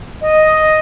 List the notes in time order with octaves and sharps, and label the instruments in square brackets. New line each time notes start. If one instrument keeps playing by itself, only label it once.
[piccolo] D#5